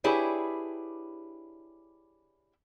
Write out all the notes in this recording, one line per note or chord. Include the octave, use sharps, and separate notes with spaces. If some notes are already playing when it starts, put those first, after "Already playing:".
D4 E4 G4 G#4 B4 C#5